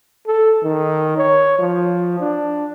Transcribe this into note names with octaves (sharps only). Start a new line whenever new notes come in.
A4
D#3
C#5
F3
D4